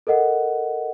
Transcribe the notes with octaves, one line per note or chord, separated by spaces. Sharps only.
A4 A#4 D#5 F#5